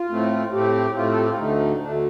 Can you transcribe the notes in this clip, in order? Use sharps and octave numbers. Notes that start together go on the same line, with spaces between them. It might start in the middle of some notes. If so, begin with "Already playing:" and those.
Already playing: F4
A2 A3 C4
A2 A3 C4 G4
A2 A3 C4 F4
A4
G4
F4
D2 D3 A3 D#4
D2 D3 A3 D4